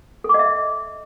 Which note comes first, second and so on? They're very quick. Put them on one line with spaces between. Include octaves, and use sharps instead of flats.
A4 D6 D#5 E5